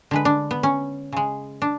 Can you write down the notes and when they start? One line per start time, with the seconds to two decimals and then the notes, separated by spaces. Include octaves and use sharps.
0.11 D3 G#3 B4
0.25 D4
0.51 B3
0.63 C#4
1.12 C#3 G#3
1.62 D4